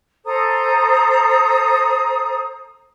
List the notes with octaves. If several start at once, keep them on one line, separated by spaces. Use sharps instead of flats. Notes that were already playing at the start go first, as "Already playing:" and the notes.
A4 C5 A#5 D#6